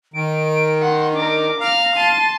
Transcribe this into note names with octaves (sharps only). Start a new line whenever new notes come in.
D#3 D7
F#5 C6
D4 A#4 D6
F5 A#5 F6
A5 C6 D#7